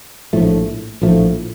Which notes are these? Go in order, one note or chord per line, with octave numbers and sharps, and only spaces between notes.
A#1 A2 F3 A3
A#1 A2 F3 A3